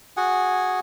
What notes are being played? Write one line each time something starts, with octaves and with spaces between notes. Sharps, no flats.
F#4 G#4 F#5 G#5